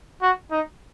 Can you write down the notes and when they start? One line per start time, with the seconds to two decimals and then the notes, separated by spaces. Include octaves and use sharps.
0.22 F#4
0.51 D#4